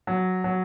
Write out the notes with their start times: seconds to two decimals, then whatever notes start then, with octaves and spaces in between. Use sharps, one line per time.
0.07 F#3
0.44 F#3